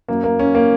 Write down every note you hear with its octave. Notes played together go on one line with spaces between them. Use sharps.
F#2 F#3 A#3
A#3
C#4
A#3